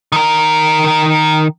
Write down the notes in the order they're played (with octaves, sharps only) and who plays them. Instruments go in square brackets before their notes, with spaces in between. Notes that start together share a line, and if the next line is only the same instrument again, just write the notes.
[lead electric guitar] D#3 A#4